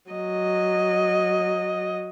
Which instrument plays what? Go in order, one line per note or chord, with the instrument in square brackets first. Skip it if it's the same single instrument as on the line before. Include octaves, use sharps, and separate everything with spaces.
[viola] F#3 D#5